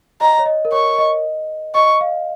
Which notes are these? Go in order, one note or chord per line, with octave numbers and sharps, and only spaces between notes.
D#5 A#5
C#5
D#5
A#4
C#5 C#6
D#5
D#5 C#6
F5